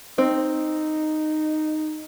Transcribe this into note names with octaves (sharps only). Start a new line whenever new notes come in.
C4 D#4